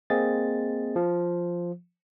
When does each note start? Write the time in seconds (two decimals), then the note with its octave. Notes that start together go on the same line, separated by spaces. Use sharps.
0.10 A#3 C4 G#4 D#5 A6
0.96 F3